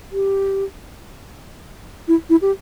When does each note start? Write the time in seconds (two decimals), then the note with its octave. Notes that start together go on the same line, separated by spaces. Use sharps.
0.12 G4
2.08 E4
2.29 E4
2.42 G4